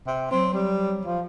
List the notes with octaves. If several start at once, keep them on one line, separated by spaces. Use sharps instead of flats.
C3
F#3 C4
G3
F3